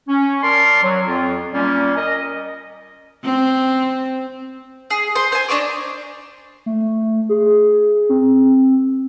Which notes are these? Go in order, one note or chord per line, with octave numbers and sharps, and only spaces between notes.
C#4
A#4 D5 A5 C6
F#3
F2 F4
A#2 G3 A#3 C#4
A#4 D#5
C4
G#4
C5 C6
C5 G#5
D4 D#4 C#5 D6
A3
G#4
C4